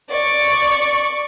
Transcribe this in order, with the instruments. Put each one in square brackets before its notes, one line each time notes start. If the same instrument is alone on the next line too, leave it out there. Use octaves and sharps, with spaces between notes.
[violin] D5 C#6